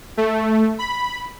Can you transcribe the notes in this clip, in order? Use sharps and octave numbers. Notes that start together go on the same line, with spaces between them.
A3
B5